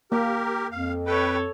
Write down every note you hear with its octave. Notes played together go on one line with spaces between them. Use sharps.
A#3 G4 A#4
F2 F5
A4 B4 C#5 G5